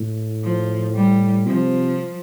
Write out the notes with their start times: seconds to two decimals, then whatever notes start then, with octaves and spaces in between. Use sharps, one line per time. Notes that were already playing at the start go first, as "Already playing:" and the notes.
Already playing: A2
0.44 F3
0.96 G3
1.47 C3 F3